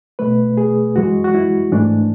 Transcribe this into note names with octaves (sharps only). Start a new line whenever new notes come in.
B2 A3 B4
G#4
F#2 E3 G#3 F#4
F#4
E4
G#2 E3 A3 D4